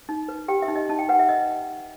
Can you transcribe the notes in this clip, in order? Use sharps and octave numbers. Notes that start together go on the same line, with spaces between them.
D#4
B4
G4 G5
E5
D#4
D#5
D#4 A5
G5
B4 F#5
E5
D#5